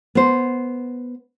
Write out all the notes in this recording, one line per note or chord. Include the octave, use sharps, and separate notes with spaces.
B3 C5